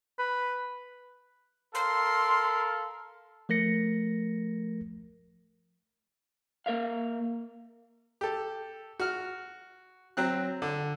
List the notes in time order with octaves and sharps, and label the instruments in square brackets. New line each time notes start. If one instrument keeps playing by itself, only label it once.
[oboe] B4
[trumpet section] A4 A#4 F5 [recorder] C6
[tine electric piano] F3 A3 A#4 A#6 C#7
[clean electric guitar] A#3 A#4 E5 F5
[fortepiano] G4 A4
F#4 F6
F#3 C4 F#6
D3